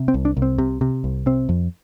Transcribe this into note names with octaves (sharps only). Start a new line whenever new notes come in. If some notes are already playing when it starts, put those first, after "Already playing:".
Already playing: C3
C4
C2
D4
C2
C4
C3
C3
C2
C3 C4
F2